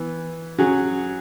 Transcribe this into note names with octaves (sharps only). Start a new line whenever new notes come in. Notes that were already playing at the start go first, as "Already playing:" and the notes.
Already playing: E3 B3
F#3 C#4 G#4